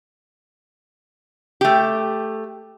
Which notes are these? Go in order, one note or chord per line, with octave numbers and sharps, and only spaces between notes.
A3 G4